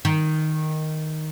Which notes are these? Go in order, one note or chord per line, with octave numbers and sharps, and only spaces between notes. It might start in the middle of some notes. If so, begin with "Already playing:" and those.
D#3